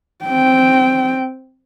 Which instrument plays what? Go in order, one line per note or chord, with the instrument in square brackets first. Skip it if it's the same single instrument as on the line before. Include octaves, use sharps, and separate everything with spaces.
[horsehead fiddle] C4 G5